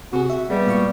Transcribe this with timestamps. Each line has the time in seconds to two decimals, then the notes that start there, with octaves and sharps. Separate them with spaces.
0.13 C3 F#4 G#4
0.30 E5
0.50 G3 G#3 B3
0.66 A#2 F5 C#6